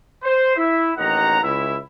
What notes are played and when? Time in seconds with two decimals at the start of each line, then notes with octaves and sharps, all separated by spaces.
0.23 C5
0.57 E4 E5
0.97 A1 D#2 D#4 F#5 A#5
1.42 C#2 E4 E5